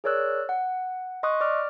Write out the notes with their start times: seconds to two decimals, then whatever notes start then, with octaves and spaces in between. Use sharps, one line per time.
0.04 G#4 A#4 C#5 D5 E6 F#6
0.49 F#5
1.23 D#5 C6 C#6 D#6 F#6
1.41 D5 D6 F6